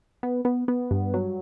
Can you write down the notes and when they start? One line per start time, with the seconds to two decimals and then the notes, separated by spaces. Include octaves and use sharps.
0.23 B3
0.45 B3
0.68 B3
0.91 G2
1.14 F#3